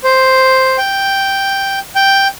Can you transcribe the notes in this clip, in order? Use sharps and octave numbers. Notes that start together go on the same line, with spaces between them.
C5
G5
G5